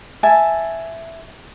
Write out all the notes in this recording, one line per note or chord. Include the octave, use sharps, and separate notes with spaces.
E5 G#5 A5